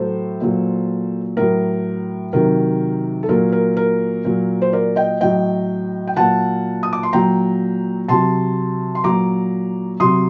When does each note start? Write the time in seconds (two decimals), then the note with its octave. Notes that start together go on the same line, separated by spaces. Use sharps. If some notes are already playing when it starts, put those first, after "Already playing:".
Already playing: A2 F#3 A4 C5
0.41 A#2 F#3
1.37 A2 F#3 A#4
2.33 C3 D#3 F#3 A#4
3.23 A4
3.29 A#2 F#3 A#4
3.52 A#4
3.77 A#4
4.25 A#2 F#3
4.62 C5
4.73 A#4 D5
4.96 D#5 G5
5.21 A2 F#3 D#5 G5
6.07 G5
6.16 A#2 F#3 F#5 A5
6.83 D#6
6.93 D6
7.03 C6
7.13 A#2 F#3 G5 A#5
8.08 C3 F#3 A5 C6
8.95 C6
9.04 A#2 F#3 A#5 D6
10.00 C3 F#3 C6 D#6